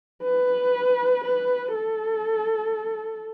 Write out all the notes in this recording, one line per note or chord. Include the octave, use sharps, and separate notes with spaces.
B4
B4
A4